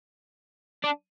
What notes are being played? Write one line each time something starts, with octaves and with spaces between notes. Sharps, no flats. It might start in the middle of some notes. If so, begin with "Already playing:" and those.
D4